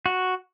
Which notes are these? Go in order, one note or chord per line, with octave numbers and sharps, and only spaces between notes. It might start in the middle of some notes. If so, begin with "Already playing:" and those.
F#4